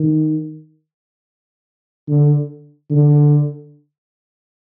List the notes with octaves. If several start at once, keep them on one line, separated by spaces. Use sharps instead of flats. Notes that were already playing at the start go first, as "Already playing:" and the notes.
Already playing: D#3
D3
D3